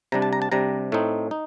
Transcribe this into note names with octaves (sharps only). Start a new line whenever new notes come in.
C3 G3 D4 A#5
A5
A#5
A5
C3 G3 D4 A#5
A2 A3 C4 D#4
D#4